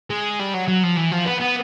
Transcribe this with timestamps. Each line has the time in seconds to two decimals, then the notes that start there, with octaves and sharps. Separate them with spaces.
0.10 G#3
0.39 G3
0.54 F#3
0.68 F#3
0.83 F3
0.97 E3
1.12 F3
1.26 B3
1.40 B3